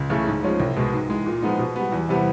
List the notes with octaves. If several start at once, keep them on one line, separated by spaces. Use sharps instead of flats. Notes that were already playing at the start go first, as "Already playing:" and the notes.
Already playing: C#2
C#3 E3 A3
G#2
F3 G#3 C#4
C2
B2 G#3
G#2
E3 G#3
A#2
F3 G#3 B3 D#4
B2
G3 B3
E2
C3 E3 G3 B3